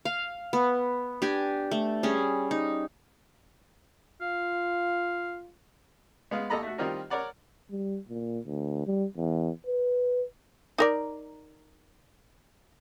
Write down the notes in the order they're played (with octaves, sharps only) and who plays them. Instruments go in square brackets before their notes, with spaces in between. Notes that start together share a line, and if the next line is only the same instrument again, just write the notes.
[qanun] F5
B3
D4 G4 G#5
A3
G3 C#4 G#4
D#4
[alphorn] F4 [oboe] F5
[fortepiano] G#3 B3 F5
D#2 A4 D#5 A#5 B5
A3 F#4
D#3 G3 C4 F4 A#4 D#5
A#4 C#5 D5 F#5
[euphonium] G3
A#2
D2
G3
E2
B4
[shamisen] D#4 A#4 D5